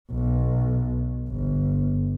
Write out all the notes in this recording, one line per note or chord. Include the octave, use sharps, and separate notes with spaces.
B1
G1